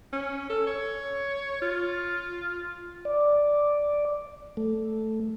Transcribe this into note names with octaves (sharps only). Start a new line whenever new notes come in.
C#4
A4
C#5
F4
D5
A3